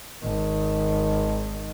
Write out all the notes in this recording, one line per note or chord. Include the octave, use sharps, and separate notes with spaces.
G#1 D#3